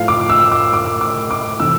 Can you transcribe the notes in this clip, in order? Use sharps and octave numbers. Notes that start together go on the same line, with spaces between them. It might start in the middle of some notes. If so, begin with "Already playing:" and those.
Already playing: A2 F3 A3 F5
D6
E6
D6
D6
D6
D6
C3 E3 A3 E6